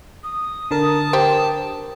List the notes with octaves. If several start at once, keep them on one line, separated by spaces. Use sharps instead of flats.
D#6
D3 A#4 A5
G4 C5 G5